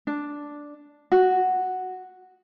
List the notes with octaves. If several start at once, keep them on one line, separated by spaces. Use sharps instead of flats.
D4
F#4